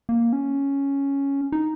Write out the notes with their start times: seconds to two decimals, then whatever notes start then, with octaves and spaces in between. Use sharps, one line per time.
0.09 A#3
0.33 C#4
1.52 D#4